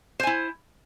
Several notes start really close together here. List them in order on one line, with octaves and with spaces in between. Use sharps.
C5 G#5 E4